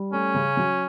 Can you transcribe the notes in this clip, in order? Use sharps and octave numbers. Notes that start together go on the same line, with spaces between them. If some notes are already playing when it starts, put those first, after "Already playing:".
Already playing: G3
A3 C#4
C#3
F#3